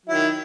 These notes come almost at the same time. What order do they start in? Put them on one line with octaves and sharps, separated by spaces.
F#3 E4 D#3